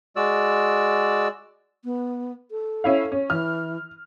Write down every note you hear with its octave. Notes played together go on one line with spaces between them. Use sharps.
G#3 F#4 D5 E6
B3
A4
C#4 E4 F5
C#4
E3 F6